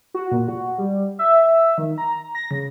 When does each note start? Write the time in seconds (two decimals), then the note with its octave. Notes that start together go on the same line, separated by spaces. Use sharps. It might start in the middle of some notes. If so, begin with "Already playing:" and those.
0.14 F#4
0.32 A#2
0.48 F#4
0.78 G3
1.19 E5
1.78 D#3
1.98 A#5
2.35 A#6
2.51 C#3